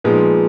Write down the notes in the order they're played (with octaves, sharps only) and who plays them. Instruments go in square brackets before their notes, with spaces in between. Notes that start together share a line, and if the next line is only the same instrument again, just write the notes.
[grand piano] A#2 F3 G#3 B3 D#4